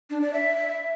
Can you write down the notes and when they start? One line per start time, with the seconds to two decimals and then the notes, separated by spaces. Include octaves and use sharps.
0.10 D4
0.22 D5
0.33 E5